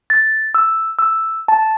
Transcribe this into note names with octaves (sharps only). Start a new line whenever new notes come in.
A6
E6
E6
A5